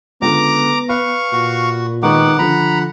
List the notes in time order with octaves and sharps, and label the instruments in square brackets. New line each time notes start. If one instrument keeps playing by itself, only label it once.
[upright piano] C#2 D3 [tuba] B3 [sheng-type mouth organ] A#5 D6
[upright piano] B4 [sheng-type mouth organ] F5 C#6
[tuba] A#2 [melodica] F#4
[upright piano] D#3 G#3 C#6 [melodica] B3 D#4 D6 [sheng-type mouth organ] F#5
[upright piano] D3 F3 [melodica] A#5 B5